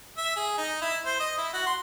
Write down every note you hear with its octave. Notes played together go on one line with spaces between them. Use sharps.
E5
G#4
D#4
E4
C5
D#5
E4
F#4
C6